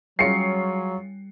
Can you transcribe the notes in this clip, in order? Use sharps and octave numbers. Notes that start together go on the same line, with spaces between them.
F#3 G3 C#4 F4 G#4 C7 C#7